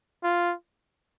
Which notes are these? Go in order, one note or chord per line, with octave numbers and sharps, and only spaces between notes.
F4